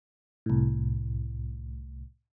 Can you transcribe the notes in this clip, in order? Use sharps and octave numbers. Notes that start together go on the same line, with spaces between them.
C2 A2